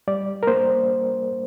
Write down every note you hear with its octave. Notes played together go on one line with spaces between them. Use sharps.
G3 D5
A#4
A#3 C5